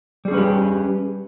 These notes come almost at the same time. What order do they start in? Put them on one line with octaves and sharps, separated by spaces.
G3 G#4 C#4 B4 G4